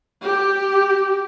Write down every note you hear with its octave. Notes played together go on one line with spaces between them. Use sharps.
G4